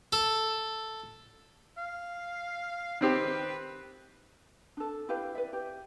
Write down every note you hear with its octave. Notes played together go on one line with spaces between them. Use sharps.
A4
F5
D#3 C4 G4 B4
D4 A4
E4 G4 B4 F5
B4 D5 E5
G4